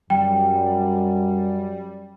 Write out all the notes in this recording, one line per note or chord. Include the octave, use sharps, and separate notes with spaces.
F#2 G3 G5